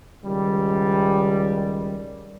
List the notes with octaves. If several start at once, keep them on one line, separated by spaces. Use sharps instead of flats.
C#2 D#3 G3